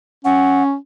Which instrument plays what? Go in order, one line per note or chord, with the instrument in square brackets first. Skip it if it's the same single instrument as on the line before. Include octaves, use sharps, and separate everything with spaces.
[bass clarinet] C#4 [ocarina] F#5